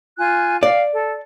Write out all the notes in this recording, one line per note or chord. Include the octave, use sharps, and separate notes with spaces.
F4 G#5 F#6
D5 F5
A4